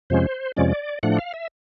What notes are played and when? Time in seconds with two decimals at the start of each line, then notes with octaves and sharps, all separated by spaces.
0.10 F2 C3 F3 G#3 C#4 C5
0.57 F2 C3 F3 G#3 C#4 D5
1.03 A2 F3 A3 D4 F#5
1.19 F5
1.34 E5